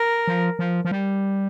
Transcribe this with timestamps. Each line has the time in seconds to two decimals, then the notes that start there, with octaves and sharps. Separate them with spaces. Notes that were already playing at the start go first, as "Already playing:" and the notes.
Already playing: A#4
0.27 F3
0.59 F3
0.85 F3
0.91 G3